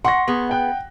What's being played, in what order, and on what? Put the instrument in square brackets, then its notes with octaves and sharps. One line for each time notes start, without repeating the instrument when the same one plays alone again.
[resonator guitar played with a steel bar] F#5 [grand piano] C6 C#6 A#6
[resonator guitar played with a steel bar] B3 G#4
[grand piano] F#5 G5 F#6